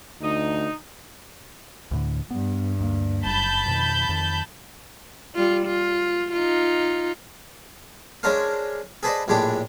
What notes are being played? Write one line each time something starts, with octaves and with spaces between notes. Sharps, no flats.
D2 D#4
D2 A2 D3
G2 B3
D2 G3 A#3
F#1 A5 B5 G6
F2 B2 D#3
F2 D#3
G3 F4
F4
D#4 F4
G#3 C#4 D4 A#4 C5 F5
G#4 A4 B4 C5 D5 D#5
A#1 A2 G#3 D4 G4 A4